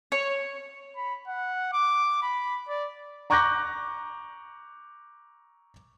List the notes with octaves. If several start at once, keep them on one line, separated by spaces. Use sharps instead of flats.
C#5
B5
F#5
D6
B5
D5
A#5 C#6 D6 F#6 G6 A#6